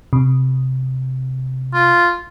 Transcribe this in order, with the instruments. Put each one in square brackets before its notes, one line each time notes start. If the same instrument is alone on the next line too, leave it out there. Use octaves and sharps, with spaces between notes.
[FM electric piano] C3
[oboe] F4